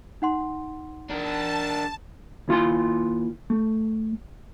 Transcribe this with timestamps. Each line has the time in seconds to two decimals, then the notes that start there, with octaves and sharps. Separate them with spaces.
0.22 D#4 F#5 C6
1.10 D4 A#4 A5
2.48 D#2 E4 F4 G#5 C6
3.50 A3